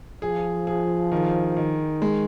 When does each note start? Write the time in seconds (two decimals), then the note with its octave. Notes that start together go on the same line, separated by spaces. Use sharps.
0.22 F3 G#4
0.67 G#4
1.12 D#3
1.57 D#3
2.02 G#3